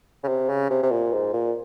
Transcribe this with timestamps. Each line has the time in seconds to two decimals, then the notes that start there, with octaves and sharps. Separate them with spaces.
0.24 C#3
0.28 C3
0.49 C#3
0.70 C3
0.83 C3
0.91 A#2
1.13 G#2
1.34 A#2